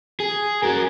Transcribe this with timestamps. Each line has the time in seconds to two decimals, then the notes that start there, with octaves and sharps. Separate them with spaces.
0.20 G#4
0.63 F#4 A#4